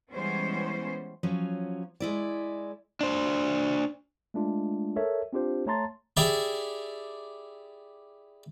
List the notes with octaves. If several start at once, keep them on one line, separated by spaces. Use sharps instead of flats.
E3 G3 G#3 B3 C#4 C5
F3 F#3 C#4
G#3 E4 D5
D4 C5
G#3 A3 D4 F4
A4 A#4 C#5 E5
C4 D4 F4 G4 C5
A3 C#5 A5 A#5 C6 A6
E4 G4 G#4 D5 E5